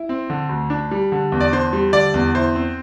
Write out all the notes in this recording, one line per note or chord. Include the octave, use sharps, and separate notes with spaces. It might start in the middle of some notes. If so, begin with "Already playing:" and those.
Already playing: E4
C4
D3
D2
D4
G3
D3
E2
D5
D4 C5
G3
D3 D5
E2
E4 C5
C4